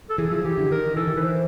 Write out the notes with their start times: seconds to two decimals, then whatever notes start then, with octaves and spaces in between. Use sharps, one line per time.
0.10 A4
0.18 E3 G#4
0.32 F3
0.44 E3 G4
0.58 D3
0.71 D#3 A#4
0.96 E3 A4
1.07 D#3
1.16 E3 B4
1.22 C5